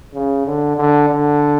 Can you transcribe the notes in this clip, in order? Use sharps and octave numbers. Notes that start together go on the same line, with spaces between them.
C#3
D3
D3
D3